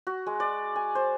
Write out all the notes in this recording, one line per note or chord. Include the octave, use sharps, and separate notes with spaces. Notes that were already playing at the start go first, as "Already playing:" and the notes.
F#4
G#3
D5
G#5
C5